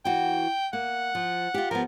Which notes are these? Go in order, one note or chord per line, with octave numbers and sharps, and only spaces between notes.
E3 F#4 G5
A#3 F#5
F3
F4 G4
F3 B3 A#4